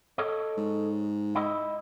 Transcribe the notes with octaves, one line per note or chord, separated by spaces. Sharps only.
A4 C#5 D#5
G#2
E4 D#5